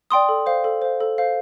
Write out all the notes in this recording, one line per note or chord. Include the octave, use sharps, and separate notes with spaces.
D5 G5 C6 D#6
A4
C5 F5
A4
C5 F5
A4
C5 F5